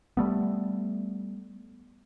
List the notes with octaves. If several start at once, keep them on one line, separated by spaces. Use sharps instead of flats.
G3 A3 B3